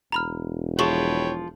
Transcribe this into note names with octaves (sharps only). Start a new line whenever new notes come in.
E1 A#5 B5 F6
F3 G#4 B4 C#5 G5 C#6 F#7